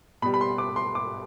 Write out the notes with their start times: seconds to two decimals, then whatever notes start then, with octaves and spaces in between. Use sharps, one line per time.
0.22 B2 B5
0.25 G3
0.34 B5
0.41 C6
0.58 D6
0.76 C6
0.95 D6